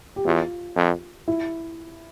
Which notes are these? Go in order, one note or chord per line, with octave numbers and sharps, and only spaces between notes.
G4
E2 F4
F2
E4